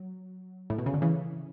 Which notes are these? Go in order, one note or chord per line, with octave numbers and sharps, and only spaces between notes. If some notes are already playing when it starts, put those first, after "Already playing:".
Already playing: F#3
A2
B2
C#3
D3
C#3 E3